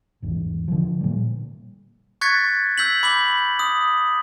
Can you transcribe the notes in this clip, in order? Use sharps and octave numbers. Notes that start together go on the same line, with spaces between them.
G#1 E2
D3 F3
A#2 G3
C#6 F#6 G#6 A6 B6 C#7
E6 G6 B6 F#7
B5 D6 G6 B6 F#7
D#6